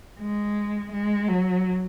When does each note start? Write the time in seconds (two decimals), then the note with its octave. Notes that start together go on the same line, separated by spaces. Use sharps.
0.20 G#3
0.92 G#3
1.28 F#3